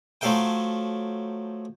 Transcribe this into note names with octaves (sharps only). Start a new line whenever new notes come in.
F3 F#3 A3 A4 F5 G5